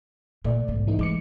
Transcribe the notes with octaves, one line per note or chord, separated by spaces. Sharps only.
A#2 A3 D5
B1 G#2
E3 A3 D#4
E3 G#3 D6 C#7